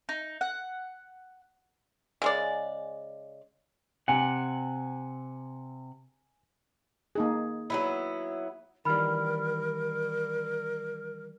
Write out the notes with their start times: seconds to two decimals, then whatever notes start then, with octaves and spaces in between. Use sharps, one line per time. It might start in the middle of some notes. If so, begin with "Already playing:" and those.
0.09 D#4
0.41 F#5
2.22 C#3 G#3 D5
4.08 C3 F#5 G#5
7.15 A#3 D#4 G#4
7.70 F#3 B3 E4
8.85 D#3 E3 G3 A#4 B5 F6